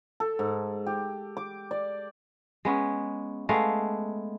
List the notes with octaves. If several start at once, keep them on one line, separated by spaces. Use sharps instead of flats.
A4
G#2
G4
D6
D5
G#3 B3 C#4
G#3 A3 B3 F5